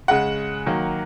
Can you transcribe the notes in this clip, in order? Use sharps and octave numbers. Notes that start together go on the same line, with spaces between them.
C#3 G#3 F#5
D#3 F#3 A#3